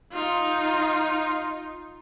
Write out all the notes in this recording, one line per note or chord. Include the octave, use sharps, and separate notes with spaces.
D#4 F4